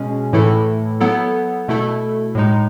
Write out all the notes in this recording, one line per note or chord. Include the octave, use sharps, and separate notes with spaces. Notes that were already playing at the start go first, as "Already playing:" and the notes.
Already playing: B2 G#3 C#4 G#4
A2 E3 A3 E4 A4
F#3 B3 E4 A4
B2 A3 E4 A4
A2 G#3 D#4